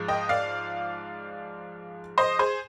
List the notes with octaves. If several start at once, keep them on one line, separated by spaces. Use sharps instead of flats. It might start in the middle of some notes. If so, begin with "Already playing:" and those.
Already playing: G#2 F3 G#3
D#5 G5
D5 F5
C5 D#5
G#4 C5